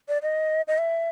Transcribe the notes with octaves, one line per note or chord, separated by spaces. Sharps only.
D5
D#5
D#5
E5